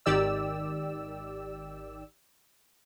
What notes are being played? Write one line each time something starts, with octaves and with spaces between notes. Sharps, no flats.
G#1 D#3 G4 D5 E6